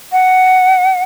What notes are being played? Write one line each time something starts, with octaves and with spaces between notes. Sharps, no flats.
F#5